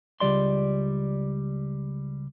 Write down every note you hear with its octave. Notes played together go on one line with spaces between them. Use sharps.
C#2 G3 D5 C6